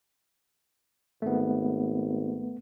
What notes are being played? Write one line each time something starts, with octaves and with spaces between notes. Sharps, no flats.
G#1 A3 B3